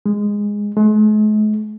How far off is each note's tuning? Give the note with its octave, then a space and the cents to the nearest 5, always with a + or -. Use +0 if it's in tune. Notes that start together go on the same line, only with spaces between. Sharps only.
G#3 -10
G#3 +45